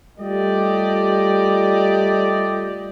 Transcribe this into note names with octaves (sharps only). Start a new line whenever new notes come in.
G3 A3 F4 G4 D5 D#5